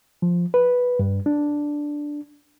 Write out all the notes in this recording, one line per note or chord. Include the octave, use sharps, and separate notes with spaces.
F3
B4
G2
D4